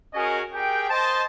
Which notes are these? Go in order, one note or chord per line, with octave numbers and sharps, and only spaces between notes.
C#4 F#4 G#4 A#4 D#5 G#5
G4 G#4 A#4 G5
C5 D#5 A5